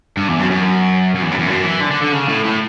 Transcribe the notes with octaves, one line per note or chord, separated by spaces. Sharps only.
G2
E2
F#2
F#2
F#2
E2
F#2
E2
F#2
E3
D3
D3
D3
C#3
A2
A2